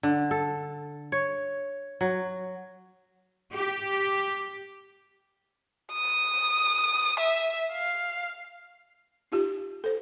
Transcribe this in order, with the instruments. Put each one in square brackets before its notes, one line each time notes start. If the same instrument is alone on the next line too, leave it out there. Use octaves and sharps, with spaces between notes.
[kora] D3
A4
C#5
F#3
[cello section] G4
[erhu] D#6
E5
F5
[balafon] D#4 F4 G4
A4 C5